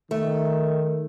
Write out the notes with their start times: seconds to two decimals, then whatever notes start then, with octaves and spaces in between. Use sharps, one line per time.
0.11 D#3 A3